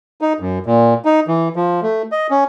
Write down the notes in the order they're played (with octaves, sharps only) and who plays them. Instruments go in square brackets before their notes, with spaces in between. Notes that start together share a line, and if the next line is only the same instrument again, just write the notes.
[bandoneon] D#4
F#2
A#2
D#4
E3
F3
A3
D#5
C#4